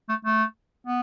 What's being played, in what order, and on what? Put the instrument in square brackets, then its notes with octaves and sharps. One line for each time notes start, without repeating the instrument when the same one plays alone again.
[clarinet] A3
A3
B3